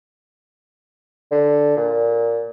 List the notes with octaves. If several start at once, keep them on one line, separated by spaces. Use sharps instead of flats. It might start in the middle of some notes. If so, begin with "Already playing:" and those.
D3
A#2